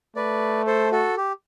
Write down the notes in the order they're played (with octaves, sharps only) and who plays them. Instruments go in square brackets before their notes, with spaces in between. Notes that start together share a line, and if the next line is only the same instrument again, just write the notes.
[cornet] A3 [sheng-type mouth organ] B4 D5
[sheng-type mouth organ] A4 C5
F#4 A4
G4